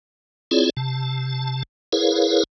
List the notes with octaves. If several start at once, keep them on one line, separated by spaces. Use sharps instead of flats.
C4 E4 F4 G#4 C#5 D5
C3 A5
E4 G#4 A#4 B4 C#5 F5